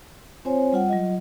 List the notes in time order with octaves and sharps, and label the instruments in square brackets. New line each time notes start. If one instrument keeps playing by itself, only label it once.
[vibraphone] C4 F4 C5 C#5 G#5
G3 F4 F#5
F#3 F4 D#5